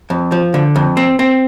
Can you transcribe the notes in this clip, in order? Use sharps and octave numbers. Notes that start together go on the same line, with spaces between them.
F2
F3
D3
F2
C4
C4